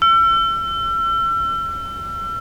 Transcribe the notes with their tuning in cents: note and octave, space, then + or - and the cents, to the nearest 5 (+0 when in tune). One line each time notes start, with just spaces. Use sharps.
E6 +35